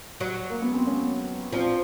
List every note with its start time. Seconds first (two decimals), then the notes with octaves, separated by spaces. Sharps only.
0.20 F#3
0.50 A#3
0.62 B3
0.74 C4
0.87 B3 C#4
1.53 F3 C4 D4